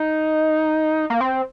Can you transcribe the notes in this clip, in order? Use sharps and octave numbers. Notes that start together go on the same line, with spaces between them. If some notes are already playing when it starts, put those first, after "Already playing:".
Already playing: D#4
A#3
C4